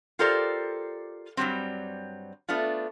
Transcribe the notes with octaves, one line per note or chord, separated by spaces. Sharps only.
F4 G4 A4 A#4 C5 D5
G2 A#2 F#3 G3 C4
A3 B3 D4 F4